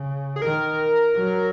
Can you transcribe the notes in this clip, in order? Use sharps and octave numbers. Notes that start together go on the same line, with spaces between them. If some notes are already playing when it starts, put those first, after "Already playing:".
Already playing: C#3
G#4
D#3 A#4
F#3